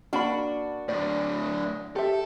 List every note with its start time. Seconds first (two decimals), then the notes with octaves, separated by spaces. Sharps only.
0.13 A#3 D4 F#4 B5
0.88 A2 D3 D5
1.96 G4 A4 E5